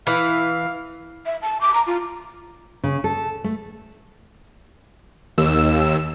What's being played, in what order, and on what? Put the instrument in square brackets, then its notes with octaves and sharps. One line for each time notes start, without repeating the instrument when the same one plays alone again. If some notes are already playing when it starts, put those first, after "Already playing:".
[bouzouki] E3 [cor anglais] F5
[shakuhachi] E5
A5
D6
A#5
F4
[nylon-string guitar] C#3
A4
A3
[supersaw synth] D#2 E6